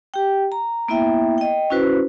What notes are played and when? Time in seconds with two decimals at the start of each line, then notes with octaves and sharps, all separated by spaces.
0.14 G4 G5
0.52 A#5
0.88 A#3 B3 E4 E5 G5
1.38 D#5 G5
1.70 C#4 E4 F#4 B4 C5